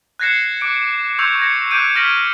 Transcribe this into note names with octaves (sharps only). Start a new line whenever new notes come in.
F#6 G#6 A#6 C7 C#7 E7
D6 F#6 D7
C#6 E6 G6 G#6 C#7 F7
G#6 A#6 C#7
D6 E6 F#6 G6 D7 D#7
F6 G#6 A#6 B6 D7 F#7